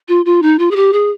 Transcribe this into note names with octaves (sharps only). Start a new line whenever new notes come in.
F4
F4
D#4
F4
G#4
G4
G#4